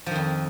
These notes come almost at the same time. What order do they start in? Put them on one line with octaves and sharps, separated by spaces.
F3 D#3 F2